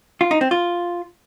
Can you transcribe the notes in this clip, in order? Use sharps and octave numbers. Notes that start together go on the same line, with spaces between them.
F4
D#4
C4
F4